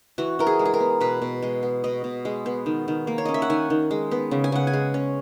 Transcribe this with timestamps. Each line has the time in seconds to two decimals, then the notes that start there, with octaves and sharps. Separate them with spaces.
0.18 E3 F#4
0.39 E3 A#4
0.47 G#4
0.59 G#3
0.65 G#4
0.74 A#4
0.80 B3
1.01 B2 B4
1.22 B2
1.42 G#3
1.63 B3
1.84 B2 D#5
2.04 B2
2.25 G#3
2.46 B3
2.66 D#3
2.88 D#3
3.07 A#3
3.18 C#5
3.25 C#4 D#5
3.34 E5
3.42 F#5
3.50 D#3 G#5
3.70 D#3
3.91 G#3
4.11 B3
4.31 C#3
4.44 G#5
4.52 C#3 F#5
4.67 G#5
4.73 G#3
4.94 C#4